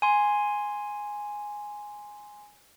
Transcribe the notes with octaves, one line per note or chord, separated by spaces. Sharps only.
G#5 C6